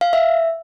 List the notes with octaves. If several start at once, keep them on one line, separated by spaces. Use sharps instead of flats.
F5
E5